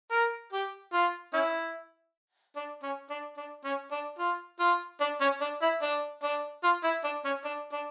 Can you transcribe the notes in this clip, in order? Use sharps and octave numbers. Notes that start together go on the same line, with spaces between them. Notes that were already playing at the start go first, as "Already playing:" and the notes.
A#4
G4
F4
C#4 E4
D4
C#4
D4
D4
C#4
D4
F4
F4
D4
C#4
D4
E4
D4
D4
F4
E4
D4
C#4
D4
D4